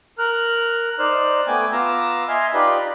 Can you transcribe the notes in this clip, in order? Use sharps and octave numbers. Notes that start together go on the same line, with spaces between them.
A#4 F6 F#6
D#4 C5 D5 F6 F#6
A3 B3 G5 G#5 D6
B3 F4 A#5 D6 E6
D#5 E5 G#5 C6 F6
D#4 F4 G4 B4 D5